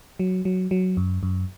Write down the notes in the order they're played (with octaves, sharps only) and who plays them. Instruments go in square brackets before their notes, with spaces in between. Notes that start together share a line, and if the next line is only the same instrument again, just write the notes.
[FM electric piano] F#3
F#3
F#3
F#2
F#2